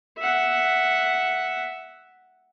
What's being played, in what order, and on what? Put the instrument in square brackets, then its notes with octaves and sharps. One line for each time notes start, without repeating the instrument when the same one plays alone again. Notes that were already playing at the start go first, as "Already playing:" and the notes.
[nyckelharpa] E5 F#5